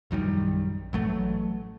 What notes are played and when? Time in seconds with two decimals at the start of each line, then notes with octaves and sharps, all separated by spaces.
0.11 A#1 F#2 D#3 G3
0.93 A1 F#3 A3